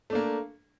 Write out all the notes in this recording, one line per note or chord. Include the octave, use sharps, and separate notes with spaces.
A3 A#3 D4